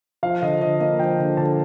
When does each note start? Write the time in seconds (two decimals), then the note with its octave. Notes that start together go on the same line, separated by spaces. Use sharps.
0.23 F3 F5
0.42 D3 D#5
0.61 D3 D#5
0.80 A#3 D#5
0.99 F3 G5
1.19 D3
1.37 D3 A5